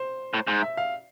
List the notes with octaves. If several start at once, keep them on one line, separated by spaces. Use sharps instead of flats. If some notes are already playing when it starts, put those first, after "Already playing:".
Already playing: C5
A2
G#2
E5
F5